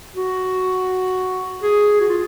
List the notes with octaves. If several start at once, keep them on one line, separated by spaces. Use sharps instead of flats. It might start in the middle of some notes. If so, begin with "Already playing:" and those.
F#4
G#4
F#4
F4